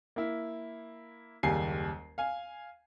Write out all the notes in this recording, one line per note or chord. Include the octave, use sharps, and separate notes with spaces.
A#3 E4
F#1 D#2 G3 G#5 C7
F5 G#5